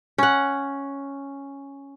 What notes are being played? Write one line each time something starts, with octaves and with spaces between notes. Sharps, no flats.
C#4 F#5